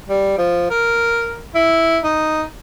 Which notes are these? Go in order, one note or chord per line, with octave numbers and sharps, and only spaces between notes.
G3
F3
A#4
E4
D#4